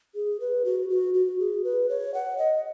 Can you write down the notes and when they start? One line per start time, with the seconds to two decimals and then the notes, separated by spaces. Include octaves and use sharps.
0.15 G#4
0.40 B4
0.65 F#4
0.90 F#4
1.14 F#4
1.39 G#4
1.64 B4
1.89 C#5
2.14 F#5
2.38 D#5